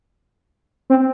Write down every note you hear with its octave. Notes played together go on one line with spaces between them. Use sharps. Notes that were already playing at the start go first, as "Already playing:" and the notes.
C4